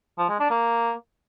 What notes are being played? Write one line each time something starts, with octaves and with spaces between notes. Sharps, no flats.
F3
G#3
D4
A#3